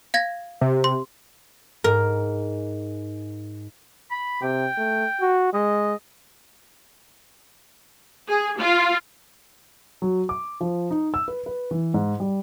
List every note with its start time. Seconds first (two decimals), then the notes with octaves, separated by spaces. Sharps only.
0.14 F5 G#6 A#6
0.61 C3
0.84 C6
1.84 G#2 A#4
4.11 B5
4.42 C3 G5
4.77 A3
5.21 F#4
5.53 G#3 D#5
8.28 G#4
8.59 F4
10.02 F#3
10.29 D6
10.61 F3
10.91 D#4
11.14 E6
11.28 B4
11.46 B4
11.71 E3
11.94 G#2
12.20 G3